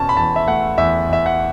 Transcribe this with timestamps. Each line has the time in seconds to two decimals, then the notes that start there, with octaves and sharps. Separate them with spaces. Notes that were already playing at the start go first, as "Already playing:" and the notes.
Already playing: E2 B2 C#4 A5
0.09 B5
0.17 E2 A5
0.36 E5
0.47 A3 F#5
0.78 E2 E5
1.09 E2 E5
1.26 F#5